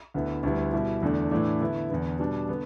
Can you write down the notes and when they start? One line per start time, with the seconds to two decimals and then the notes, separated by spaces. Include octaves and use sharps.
0.14 D2 D3 B3 E4
0.43 D2 D3 G3 B3 E4
0.73 B2 G3 E4
1.02 E2 D3 A3 D4
1.31 A2 E3 A3 D4
1.61 D3 B3 E4
1.90 E2 D3 B3
2.19 B2 G3 D4
2.49 D3 B3